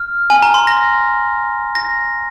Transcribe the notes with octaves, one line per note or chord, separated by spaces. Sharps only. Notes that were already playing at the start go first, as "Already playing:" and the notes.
Already playing: F6
G#5
A#5
C6
A#6
A#6